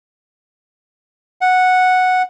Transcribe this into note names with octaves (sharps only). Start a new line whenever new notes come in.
F#5